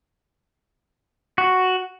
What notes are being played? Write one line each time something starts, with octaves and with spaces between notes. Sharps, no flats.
F#4